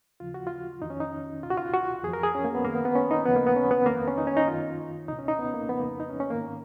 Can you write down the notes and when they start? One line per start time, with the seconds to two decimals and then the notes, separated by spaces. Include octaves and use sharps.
0.20 D#2 C#3 F3 F4
0.34 F#4
0.47 F4
0.82 F2 D#3 D#4
0.90 C#4
1.00 D#4
1.43 B2 F4
1.46 C#2 F#4
1.57 F4
1.74 F#4
2.04 F2 F3 G#4
2.13 A#4
2.23 G#4
2.35 C#4
2.44 A#3
2.55 B3
2.64 F#2 D#3 A#3
2.75 B3
2.85 B3
2.95 C#4
3.11 D#4
3.25 D#2 C#3 F3 B3
3.36 A#3
3.47 B3
3.56 C#4
3.71 B3
3.86 D#3 A#3
3.90 F2
3.97 B3
4.07 C#4
4.18 D#4
4.27 C#4
4.37 D#4
4.47 F#2 D#3 F4
5.08 C#2 B2 D#4
5.19 C#4
5.28 D#4
5.39 B3
5.54 A#3
5.69 F2 C#3 F3 B3
5.80 A#3
6.00 D#4
6.10 C#4
6.20 C#4
6.30 G#2 D#3 A#3